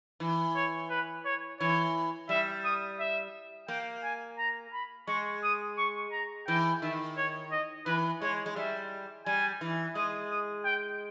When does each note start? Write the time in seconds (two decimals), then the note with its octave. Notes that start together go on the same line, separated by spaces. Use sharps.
0.20 E3
0.56 C#5
0.90 B4
1.25 C#5
1.60 E3 C#5
2.29 G3 E5
2.64 D#6
2.99 E5
3.68 A#3 G5
4.03 G#5
4.38 A#5
4.73 B5
5.07 G#3 C#6
5.43 D#6
5.78 C#6
6.12 A#5
6.47 E3 G5
6.82 D#3 E5
7.17 C#5
7.52 D#5
7.86 E3 B4
8.22 G#3 C#5
8.46 G#3
8.56 G3 E5
9.26 G3 G#5
9.61 E3
9.95 G#3 D#6
10.30 D#6
10.65 G5